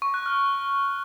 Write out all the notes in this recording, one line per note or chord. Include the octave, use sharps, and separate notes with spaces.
C#6
F#6
F6